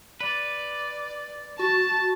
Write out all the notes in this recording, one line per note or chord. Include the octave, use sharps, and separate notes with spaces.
B4 D5
F#4 A5